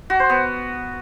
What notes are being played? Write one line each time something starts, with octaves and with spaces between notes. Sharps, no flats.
F#4
C5
B3